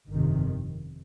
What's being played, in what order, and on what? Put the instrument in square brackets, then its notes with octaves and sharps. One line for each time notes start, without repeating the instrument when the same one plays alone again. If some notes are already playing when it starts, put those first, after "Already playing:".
[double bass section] G1 F2 C3 D#3